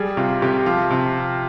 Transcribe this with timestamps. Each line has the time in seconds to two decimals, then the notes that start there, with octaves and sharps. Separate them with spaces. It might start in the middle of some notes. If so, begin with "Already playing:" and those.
Already playing: G3 G#4
0.17 C3 F4
0.42 C3 G4
0.66 F3 F4
0.91 C3